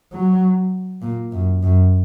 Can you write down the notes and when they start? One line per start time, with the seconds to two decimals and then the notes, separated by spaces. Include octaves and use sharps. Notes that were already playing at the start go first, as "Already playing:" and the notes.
0.13 F#3
1.02 A#2
1.32 F#2
1.63 F#2